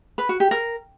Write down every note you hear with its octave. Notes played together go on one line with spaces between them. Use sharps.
B4
F#4
G4
A#4